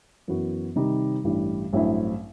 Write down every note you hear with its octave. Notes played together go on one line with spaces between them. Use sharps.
F#2 E3 B3 F#4
C3 D#3 G3 D#4
A1 G2 E3 G3
A1 G2 F#3 C4 E4